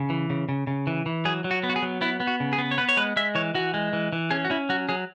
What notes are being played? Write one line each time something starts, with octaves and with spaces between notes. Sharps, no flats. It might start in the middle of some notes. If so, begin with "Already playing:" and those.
Already playing: C#3
E3
C#3
C#3
C#3
E3
E3
F#3 G#4
F#3
F#4
B3
F#4
G#4
F#3
B3 E4
B3
F#4
C#3
G#4
B3
C#5
B3 B4
C#5
G#3 B4
G#3 E5
E3 C#5
E3 F#4
G#3
E3
E3
C#4 G#4
F#4
C#4 E4
F#3 F#4
F#3 G#4